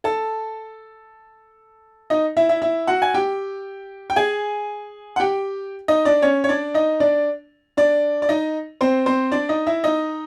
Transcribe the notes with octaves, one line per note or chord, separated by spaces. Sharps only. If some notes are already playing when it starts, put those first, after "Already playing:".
A4 A5
D#4 D#5
E4 E5
E4 E5
E4 E5
F#4 F#5
G#5
G4 G5
G5
G#4 G#5
F#5
G4 G5
D#4 D#5
D4 D5
C#4 C#5
C#5
D4 D5
D#4 D#5
D4 D5
D4 D5
D5
D#4 D#5
C4 C5
C4 C5
D4 D5
D#4 D#5
E4 E5
D#4 D#5